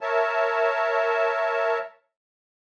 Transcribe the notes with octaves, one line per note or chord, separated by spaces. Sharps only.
A#4 C#5 E5 A5